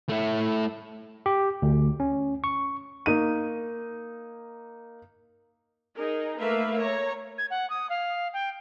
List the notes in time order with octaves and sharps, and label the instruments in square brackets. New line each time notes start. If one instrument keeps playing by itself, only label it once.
[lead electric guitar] A3 E4
[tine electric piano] G4
D2
C#4
C#6
[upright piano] A#3 D#4 D#7
[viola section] D#4 G#4 A#4
A3 A#3 A#4 B4 E5 F5
C#5 A#5
[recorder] G#6
F#5
D#6
F5
G5